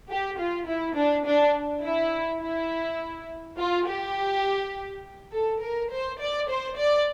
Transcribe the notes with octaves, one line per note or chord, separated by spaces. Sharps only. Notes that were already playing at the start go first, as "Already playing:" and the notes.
G4
F4
E4
D4
D4
E4
E4
F4
G4
A4
A#4
C5
D5
C5
D5